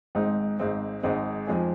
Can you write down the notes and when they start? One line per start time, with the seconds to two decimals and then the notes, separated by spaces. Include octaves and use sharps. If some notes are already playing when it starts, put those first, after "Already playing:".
0.15 G#1 G#2 G#3 C4 D#4
0.59 G#1 G#2 G#3 C4 D#4
1.03 G#1 G#2 G#3 C4 D#4
1.47 F2 F3 G#3 D#4 G#4